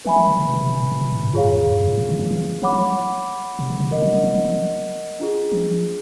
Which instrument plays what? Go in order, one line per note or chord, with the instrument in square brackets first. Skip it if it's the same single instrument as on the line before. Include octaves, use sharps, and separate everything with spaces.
[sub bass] F3 [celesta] B4 E5 G#5 B5
[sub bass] F3
D3
C#3
B2
C#3
C3
B2
A#2
C3
B2
A2
G#2
[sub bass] G2 [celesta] F4 G#4 C#5 F5
[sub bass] F#2
F2
F2
F#2
G2
G#2
C#3
D#3
F3
E3
[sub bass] F3 [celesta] C#5 F#5 B5 D6
[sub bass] F#3
C3
C#3
C3
[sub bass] C#3 [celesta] A#4 D#5 F#5
[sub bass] F#3
F#3
F3
F3
F3
[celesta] D4 F4 G#4
[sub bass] F3